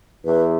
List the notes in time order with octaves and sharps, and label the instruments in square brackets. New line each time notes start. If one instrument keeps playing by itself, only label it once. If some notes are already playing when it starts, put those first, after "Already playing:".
[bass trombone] E2 [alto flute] B4